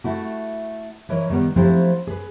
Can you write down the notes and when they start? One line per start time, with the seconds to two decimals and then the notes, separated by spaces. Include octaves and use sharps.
0.04 A3 E4 F#4
1.09 E3 E4 A#4 C#5 D#5
1.30 D#3 G3 B3
1.56 F3 F#3 A3 C4 E4 G4
2.07 G#4 B4